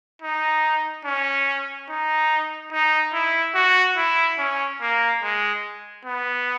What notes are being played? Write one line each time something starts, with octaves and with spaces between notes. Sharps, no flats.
D#4
C#4
D#4
D#4
E4
F#4
E4
C#4
A#3
G#3
B3